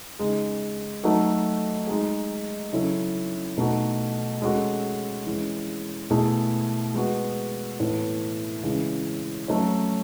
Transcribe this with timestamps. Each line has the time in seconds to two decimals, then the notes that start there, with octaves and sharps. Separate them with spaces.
0.19 C#3 G#3 D#4 G#4
1.04 F#3 A3 D#4 F#4 A4
1.87 G#3 D#4 G#4
2.72 C#3 F#3 C#4 E4 A4
3.57 B2 A3 D#4 F#4 A4
4.42 G#3 C#4 F#4 A4
5.26 E3 G#3 C#4
6.10 B2 A3 E4 G#4
6.94 G#3 B3 F#4
7.80 A2 E3 B3
8.63 C#3 E3 G#3
9.48 F#3 A3 C#4